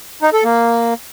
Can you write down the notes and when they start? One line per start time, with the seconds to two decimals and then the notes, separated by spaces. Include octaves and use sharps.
0.22 D#4
0.33 A4
0.44 A#3